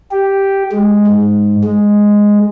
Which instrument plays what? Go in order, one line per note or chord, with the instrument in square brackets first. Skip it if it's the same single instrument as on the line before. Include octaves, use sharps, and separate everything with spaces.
[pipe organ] G4
G#3
G#2
G#3